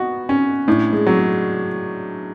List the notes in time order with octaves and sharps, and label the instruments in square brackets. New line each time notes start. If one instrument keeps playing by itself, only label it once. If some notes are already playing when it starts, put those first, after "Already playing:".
Already playing: [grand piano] B3 D#4 [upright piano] F#4
[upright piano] C#4
[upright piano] A2 [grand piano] D4
[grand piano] G#3
[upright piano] F#3
[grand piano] G#3